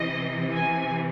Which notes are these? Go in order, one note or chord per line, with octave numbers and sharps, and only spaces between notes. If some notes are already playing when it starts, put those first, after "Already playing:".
Already playing: C3 E3 D#5
G#5